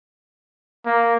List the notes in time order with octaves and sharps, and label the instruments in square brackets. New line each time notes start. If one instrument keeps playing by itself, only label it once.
[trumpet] A#3